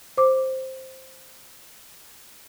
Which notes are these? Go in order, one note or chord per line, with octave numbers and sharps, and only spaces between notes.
C5 D6